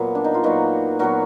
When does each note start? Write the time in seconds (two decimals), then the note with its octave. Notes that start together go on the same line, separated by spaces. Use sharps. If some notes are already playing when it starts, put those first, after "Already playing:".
Already playing: A#2 F#3 B3
0.15 D4
0.24 D#4
0.34 F4
0.43 A#2 F#3 B3 D#4 F#4
0.99 A#2 F#3 B3 F#4 A#4